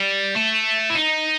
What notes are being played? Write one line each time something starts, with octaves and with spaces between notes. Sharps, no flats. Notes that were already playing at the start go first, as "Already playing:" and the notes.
Already playing: G3
A3
E4
D#4